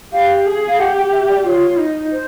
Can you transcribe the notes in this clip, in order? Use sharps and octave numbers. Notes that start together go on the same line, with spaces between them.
G4 F5
G#4
F5
G4 F#5
G5
E5
D5
F4 C#5
D#4
C5